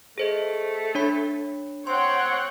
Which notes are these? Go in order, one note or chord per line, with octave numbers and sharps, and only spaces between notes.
A3 G#4 C5 D#5
D4 C#5 B5
C4 C#5 F#5 G5 C6